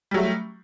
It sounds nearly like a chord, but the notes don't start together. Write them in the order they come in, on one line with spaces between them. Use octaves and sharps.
G3 F#3 A3